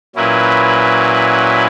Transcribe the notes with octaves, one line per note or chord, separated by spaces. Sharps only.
A#2 F#3 C#4 E4 B4